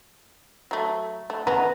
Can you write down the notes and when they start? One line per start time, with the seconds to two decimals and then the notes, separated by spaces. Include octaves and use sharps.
0.71 F#3 A3
1.30 A3
1.47 C#3 B3 A#5